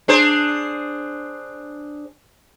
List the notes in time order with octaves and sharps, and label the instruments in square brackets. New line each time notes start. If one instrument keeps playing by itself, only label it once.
[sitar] D4 G#4 C5